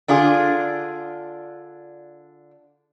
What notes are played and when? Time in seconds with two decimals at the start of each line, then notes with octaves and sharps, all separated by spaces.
0.08 D3 D4 F4 G#4